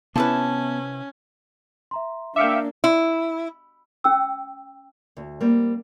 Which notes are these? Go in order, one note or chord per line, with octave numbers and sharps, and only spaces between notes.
C3 B3 C#4 E4 B4 A5
E5 A#5 C6
A#3 D4 E5 F5 G5 D6 C#7 D7
E4
C#4 G5 E6
D2
G3 A#3 C4